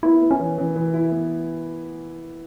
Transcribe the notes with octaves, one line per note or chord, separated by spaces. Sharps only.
B3 E4
B3
C#4
E3
E3
E3
E4
B3